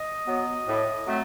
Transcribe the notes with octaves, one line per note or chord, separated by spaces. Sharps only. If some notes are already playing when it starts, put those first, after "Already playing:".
Already playing: D#5
F#3 B3
A2
F#3 A3 C4